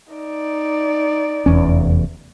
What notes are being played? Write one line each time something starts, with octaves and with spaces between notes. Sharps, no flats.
D#4 D5
F1 E2 C#4